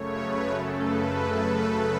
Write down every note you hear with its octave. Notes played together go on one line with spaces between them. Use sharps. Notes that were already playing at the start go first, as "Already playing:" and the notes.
Already playing: F#2 C#3 A3 C#5
B4
F#2 C#3 A3 A4
B4